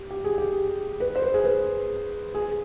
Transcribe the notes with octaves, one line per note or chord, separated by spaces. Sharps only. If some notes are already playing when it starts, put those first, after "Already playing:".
Already playing: G4
G4
G#4
G4
B4
C5
B4
G#4
B4
G#4